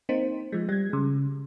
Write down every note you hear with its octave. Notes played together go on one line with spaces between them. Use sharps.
A#3 C4 D#4 C5
F3 G#3
G3 G#6
C#3 G#3